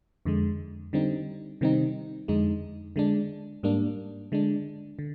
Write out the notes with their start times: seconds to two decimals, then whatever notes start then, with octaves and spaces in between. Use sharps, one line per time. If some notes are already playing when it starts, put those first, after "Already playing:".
0.25 F2 D3 G#3
0.93 D3 G3 C4 D#4
1.61 C3 D#3 G3 C4 D#4
2.28 F2 D3 G#3 D#4
2.96 D3 G#3 D4
3.63 G#2 G3 A#3 D4
4.32 D3 G#3 D4
4.99 D3